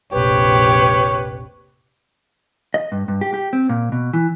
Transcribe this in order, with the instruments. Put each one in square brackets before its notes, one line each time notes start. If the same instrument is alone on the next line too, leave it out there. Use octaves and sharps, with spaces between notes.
[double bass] F1 A#1 [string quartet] G4 [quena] B4 [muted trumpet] C#5
[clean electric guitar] D#5
G2
G2
G4
G4
C4
A#2
B2
E3